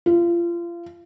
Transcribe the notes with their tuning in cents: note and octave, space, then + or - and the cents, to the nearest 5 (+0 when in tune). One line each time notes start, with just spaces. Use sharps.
F4 -30